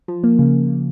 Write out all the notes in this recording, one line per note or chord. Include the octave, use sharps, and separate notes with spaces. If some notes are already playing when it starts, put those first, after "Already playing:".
F3
A#3
C#3